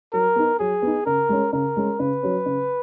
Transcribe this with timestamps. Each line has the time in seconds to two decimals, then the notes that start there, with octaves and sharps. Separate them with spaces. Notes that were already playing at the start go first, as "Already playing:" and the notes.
0.13 F#3 A#4
0.36 B3 D#4
0.59 F#3 G#4
0.82 B3 D#4
1.06 C#3 A#4
1.29 G#3 C#4
1.53 C#3 A#4
1.76 G#3 C#4
1.99 C#3 B4
2.23 F#3 C#4
2.46 C#3